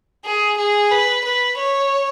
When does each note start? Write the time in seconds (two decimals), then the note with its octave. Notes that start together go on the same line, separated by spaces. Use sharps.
0.25 G#4
0.58 G#4
0.91 B4
1.25 B4
1.58 C#5